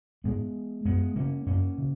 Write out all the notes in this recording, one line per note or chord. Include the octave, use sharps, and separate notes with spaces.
G#2 G#3 B3
F#2 G#3 B3
C#3 A#3 C#4
F#2 A#3 C#4
C#3